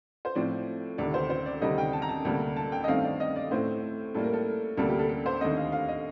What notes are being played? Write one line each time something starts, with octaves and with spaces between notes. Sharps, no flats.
C5
A2 F3 C4 D5
D2 C3 D#3 D5
C5
C5
D5
D2 C3 D#3 G3 C4 D#5
G5
A5
A#5
A5
D2 C3 G3 A#3
A5
G5
D#5
G2 D#3 A3 C4 F5
D5
D#5
D5
A2 A3 C4 C5
A2 G3 A#3 A4
A#4
A4
D2 C3 G3 A#3 A4
G4
A4
A4
C5
D#2 D3 A3 C4 D#5
F5
F5
D#5